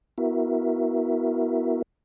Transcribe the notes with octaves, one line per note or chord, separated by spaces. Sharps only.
B3 E4 F#4 A#4 E5